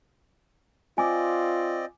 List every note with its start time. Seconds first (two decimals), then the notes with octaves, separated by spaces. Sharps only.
0.98 C4 F4 D5 D#5 G#5 D6